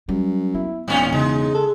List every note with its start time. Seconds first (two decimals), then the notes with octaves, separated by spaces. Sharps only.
0.09 F#2 G3
0.54 B3 E4
0.88 E1 A2 C#4 D#4
1.12 C#3 G#3 D#4
1.55 A4